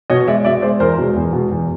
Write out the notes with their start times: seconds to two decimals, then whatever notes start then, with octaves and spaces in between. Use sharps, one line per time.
0.10 B2 C#5 D#5
0.27 G#3 D5 E5
0.45 B2 D5 E5
0.62 G#3 C5 D5
0.80 E2 A#4 C5
0.98 B2 G#3
1.16 E2
1.33 B2 G#3
1.51 E2